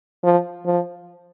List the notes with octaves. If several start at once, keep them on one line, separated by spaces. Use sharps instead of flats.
F3
F3